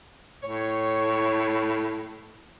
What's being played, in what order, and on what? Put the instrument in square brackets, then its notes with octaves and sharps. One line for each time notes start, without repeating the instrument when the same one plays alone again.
[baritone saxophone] A2 [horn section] C#5